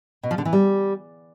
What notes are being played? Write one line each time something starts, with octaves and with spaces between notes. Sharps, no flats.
B2
F3
D3
E3
G3